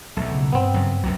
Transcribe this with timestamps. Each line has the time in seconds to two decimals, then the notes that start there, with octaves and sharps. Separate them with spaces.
0.17 B1 E2 A3
0.32 C#3
0.53 G2 B3 C4
0.74 F#2 C#3
1.04 C2 F#2 A2 F#3